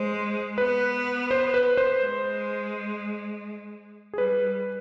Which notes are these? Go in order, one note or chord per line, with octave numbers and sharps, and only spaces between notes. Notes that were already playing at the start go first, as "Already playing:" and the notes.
Already playing: G#3 C5
B3 B4
C5
B4
C5
G#3
G#4
G3 B4